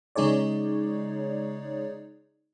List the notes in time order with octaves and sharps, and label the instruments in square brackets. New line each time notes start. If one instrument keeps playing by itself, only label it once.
[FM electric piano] C#3 G#3 D#4 G#4 C#5 D5